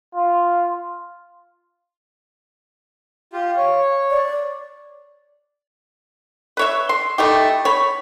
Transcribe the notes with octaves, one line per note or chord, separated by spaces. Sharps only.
F4
F4 G4 F5
C#5
D5
B4 C#5 E5
C6
A3 D#4 E4 G4
C#5 B5